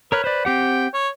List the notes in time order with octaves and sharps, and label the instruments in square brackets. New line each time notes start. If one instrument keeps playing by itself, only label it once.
[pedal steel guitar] A#4 C#5 F6 [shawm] B4
[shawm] B4 [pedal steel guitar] C5 D5
[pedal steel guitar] C4 G4 F#5 [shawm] G5
[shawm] C#5